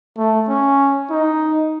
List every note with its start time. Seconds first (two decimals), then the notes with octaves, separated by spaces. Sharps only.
0.18 A3
0.48 C#4
1.10 D#4